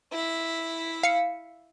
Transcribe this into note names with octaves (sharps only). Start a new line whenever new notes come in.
E4 E5
F5 C#7